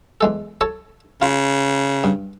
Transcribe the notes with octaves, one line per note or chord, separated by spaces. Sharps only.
E2 G#3 A4
A4 C#5 A5
C#3 F4
G2